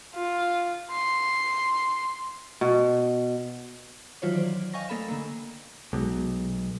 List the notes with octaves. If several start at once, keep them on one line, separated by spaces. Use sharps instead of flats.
F4
C6
B2
D#3 E3 F#3 F4 C5 C#5
C5 D5
D#5 F5 G5 G#5 C#6 A#6
A3 A#3 A4 F5 B5 E7
D3 A#3
B1 B2 G#3